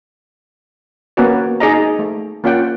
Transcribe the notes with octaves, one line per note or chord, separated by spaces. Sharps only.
A#3 B3 C#4 F#4 C#5 D5
D#4 G#4 D5 D#5 A#5
A3
A#3 C#4 F4 D5 F#5 G5